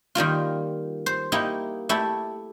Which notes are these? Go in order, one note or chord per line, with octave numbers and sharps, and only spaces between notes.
D#3 G3 A#3 F4
C5
A#3 D#4 E4 G4
A3 E4 G4 A4